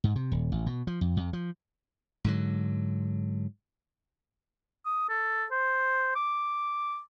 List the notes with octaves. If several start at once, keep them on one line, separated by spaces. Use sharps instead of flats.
G#2
C3
D#1
A1
B2
F3
F2
F2
F3
G#2 D3 F#3
D#6
A4
C5
D6